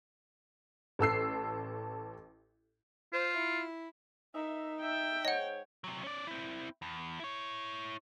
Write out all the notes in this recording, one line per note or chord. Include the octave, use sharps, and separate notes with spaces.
A1 A4 E6 C7
F4 C5
E4
A#3 D#4 D#5 E5
E5 G5
G#2 C#5 D#5 F#5
C3 F#3
C#4 D5
C4 E4
E2
E4 C#5